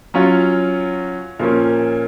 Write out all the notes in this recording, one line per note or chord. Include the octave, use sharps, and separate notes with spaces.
F#3 C#4 F4
A#2 F3 A#3 C#4